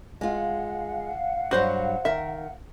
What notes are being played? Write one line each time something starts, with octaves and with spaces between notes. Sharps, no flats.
G#3 F4 F5 F#5
G2 F#3 F#4 C5
D#3 A#4 E5